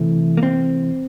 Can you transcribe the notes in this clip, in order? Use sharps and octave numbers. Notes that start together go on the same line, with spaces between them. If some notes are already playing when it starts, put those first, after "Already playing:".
Already playing: C3 E3 A3
A#3
C4